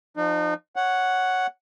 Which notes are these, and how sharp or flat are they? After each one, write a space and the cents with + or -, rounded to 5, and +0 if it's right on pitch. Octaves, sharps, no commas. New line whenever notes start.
F3 +0 D#4 -35
C#5 +0 F#5 +0